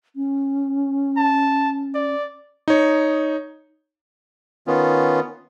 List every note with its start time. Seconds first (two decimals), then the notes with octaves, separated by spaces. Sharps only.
0.16 C#4
1.17 A5
1.95 D5
2.68 D#4 C#5
4.67 D#3 B3 C#4 F4